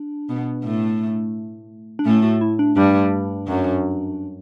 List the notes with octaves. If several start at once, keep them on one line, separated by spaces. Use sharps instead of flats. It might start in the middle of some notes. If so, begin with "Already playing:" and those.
Already playing: D4
B2 B3
A2 A3
D4
A2 A3 C#4
F#4
E4
D4
G2 G3 D4
F#2 F#3